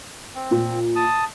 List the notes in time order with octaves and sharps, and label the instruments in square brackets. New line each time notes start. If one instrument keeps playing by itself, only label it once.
[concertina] C4
[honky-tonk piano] A#2
[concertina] A5 D#6